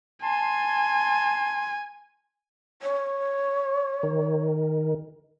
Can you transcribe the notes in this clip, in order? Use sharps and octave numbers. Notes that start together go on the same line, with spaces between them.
G#5 A5 C6
C#5
D#3